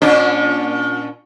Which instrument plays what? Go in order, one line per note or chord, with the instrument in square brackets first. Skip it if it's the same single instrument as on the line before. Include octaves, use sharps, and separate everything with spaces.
[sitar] A#2 C#4 D4